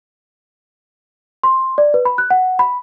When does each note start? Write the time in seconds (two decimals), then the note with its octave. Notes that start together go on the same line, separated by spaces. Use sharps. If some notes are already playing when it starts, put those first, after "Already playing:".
1.43 C6
1.78 D5
1.94 B4
2.05 B5
2.18 F#6
2.30 F#5
2.59 B5